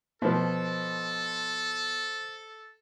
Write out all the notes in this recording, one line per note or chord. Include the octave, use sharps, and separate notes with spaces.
B2 F3 A4 B4 C5